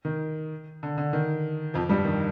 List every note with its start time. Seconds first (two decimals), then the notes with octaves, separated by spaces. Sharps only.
0.05 D#3
0.83 D3
0.98 D3
1.13 D#3
1.74 F2 F3
1.89 G2 G3
2.05 D#3